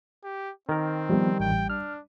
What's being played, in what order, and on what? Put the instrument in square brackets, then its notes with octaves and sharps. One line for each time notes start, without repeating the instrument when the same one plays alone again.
[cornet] G4
[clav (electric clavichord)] D#3 A#4 [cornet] C4
[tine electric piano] F3 B3 [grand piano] G3
[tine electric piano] A1 [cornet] G5
[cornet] D4 [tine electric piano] F6